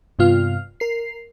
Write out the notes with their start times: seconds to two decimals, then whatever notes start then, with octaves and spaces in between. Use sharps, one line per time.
0.19 G2 C3 B3 F4 F6
0.80 A#4 C7